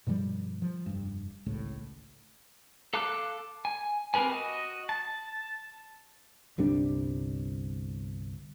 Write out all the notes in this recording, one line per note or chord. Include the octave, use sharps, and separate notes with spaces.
G2 B2 F3 G3
F3
F1 G2
G#1 C#2 A2
A4 F5 A5 D6 F#6
G#5
C4 G4 A#4 B4 G#5
F#4 D#5
A5
G1 C2 G3 D4